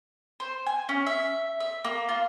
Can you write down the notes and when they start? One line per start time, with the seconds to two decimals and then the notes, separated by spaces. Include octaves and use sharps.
0.40 C5
0.66 G#5
0.89 C#4
1.06 E5
1.60 E5
1.85 A#3
2.09 F4